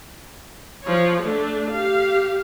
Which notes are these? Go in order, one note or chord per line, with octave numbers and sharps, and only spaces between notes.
F3 C#5
A3 D4
G4 F5